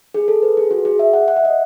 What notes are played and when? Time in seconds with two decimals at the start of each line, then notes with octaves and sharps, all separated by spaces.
0.14 G#4
0.28 A4
0.42 B4
0.57 G#4
0.71 F#4
0.85 G#4
0.99 E5
1.13 F#5
1.28 F#5
1.37 E5
1.45 D#5